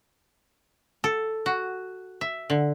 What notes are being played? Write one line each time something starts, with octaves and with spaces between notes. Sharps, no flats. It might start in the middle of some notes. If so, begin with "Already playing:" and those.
A4
F#4
E5
D3